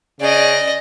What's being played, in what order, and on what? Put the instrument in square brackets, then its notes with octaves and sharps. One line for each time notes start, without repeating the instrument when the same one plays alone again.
[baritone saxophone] C#3 [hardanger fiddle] D5 D#5